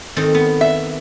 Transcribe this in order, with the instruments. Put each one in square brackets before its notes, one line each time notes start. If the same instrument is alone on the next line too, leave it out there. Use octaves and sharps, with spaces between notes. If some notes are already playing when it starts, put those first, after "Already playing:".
[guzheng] D#3 C4 A4
B3
[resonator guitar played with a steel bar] E5